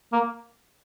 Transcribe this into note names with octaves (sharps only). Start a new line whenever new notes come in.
A#3